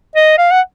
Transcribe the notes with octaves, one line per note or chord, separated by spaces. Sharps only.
D#5
F5
F#5